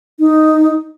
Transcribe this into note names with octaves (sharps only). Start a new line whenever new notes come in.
D#4